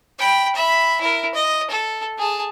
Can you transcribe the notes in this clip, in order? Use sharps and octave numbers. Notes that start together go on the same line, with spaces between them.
G5 B5
E5 B5
E4 A#4
D#5
A4
G#4 A5